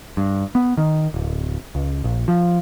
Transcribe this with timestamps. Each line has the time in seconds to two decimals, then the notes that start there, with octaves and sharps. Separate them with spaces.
0.17 G2
0.55 B3
0.77 D#3
1.14 D1
1.75 C#2
2.04 A#1
2.28 F3